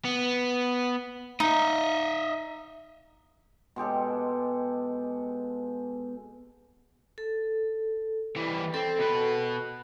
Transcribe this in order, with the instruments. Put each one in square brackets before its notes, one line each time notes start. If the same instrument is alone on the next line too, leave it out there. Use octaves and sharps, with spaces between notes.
[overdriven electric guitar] B3
[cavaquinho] D#4 [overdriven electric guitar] D#5 E5
[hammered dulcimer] B2 G#3 G4 A4
[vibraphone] A4
[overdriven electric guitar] E3 G3
[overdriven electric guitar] C4 [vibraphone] A4
[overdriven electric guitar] B2 B4